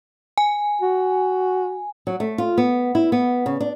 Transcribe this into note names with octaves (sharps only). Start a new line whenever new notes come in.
G#5
F#4
F#3
A3
F4
B3
E4
B3
C#3
D4